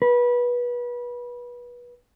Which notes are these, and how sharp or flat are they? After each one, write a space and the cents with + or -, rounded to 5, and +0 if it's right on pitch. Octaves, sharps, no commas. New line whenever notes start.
B4 -25